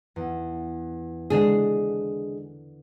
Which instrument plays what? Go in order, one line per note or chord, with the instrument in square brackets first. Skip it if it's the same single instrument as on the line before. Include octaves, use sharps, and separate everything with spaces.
[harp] E2
[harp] D3 [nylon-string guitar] G#3 D4 G#4